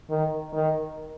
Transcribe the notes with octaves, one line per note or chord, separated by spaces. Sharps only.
D#3
D#3